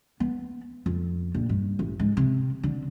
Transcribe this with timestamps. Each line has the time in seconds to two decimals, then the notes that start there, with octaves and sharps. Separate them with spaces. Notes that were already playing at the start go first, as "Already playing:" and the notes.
0.20 B3
0.86 F2
1.34 A#1
1.49 G2
1.79 A1
1.99 G#2
2.17 C3
2.63 D3